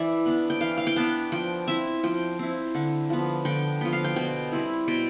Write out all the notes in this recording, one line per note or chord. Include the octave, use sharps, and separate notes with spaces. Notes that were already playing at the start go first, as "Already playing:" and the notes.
Already playing: E3 D5 E5
B3 D4
G5
E3 F5
F5
G5
B3 D4 A5
F3 G5
C4 E4 E5
F3 G5
C4 E4
D3
F3 B3
D3 G5
F3 B3 G5
F5
G5
B2 G5
G3 C4 E4
B2 G5